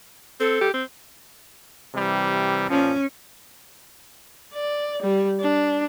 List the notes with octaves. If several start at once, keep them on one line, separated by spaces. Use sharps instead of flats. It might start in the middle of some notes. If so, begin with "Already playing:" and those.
C4 A4
G4
C4
C3 E3 G3
A#2 F3 C#4
D5
G3
D4